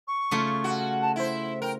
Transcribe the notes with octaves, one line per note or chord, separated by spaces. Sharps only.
C#6
C#3 A3 F4
F#4
A5
E4 C5 E5
A#4 G5